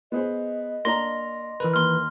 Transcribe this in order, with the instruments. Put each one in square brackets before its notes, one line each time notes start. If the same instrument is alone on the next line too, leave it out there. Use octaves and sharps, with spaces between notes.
[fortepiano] B3 G#4 C5 [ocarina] D#5
[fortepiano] A#3 D4 A#5 [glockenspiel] C6 A#6
[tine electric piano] E3 A#4 B4
[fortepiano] D#2 [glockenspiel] C6 F6